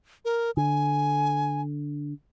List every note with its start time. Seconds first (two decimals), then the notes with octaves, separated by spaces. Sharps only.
0.25 A#4
0.57 D3 G#5